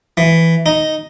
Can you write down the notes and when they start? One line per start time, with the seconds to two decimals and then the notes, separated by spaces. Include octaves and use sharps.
0.17 E3
0.66 D#4